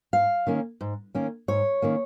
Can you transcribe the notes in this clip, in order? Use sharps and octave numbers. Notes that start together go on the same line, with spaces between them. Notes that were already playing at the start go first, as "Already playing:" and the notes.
G#2 F5
D#3 A#3 C#4
G#2
D#3 A#3 C#4
G#2 C#5
D#3 A#3 C#4